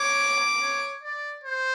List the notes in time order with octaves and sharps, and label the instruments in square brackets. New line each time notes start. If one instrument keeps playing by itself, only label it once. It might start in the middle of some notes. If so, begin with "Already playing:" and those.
Already playing: [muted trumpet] C#5 [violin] D6
[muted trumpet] C#5
D5
C5